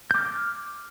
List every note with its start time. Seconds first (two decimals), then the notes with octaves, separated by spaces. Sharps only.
0.11 G6
0.14 D6
0.18 F6